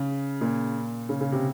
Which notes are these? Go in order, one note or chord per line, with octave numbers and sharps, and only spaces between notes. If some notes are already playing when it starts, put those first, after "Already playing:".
Already playing: C#3
A#2
C#3
C#3
C3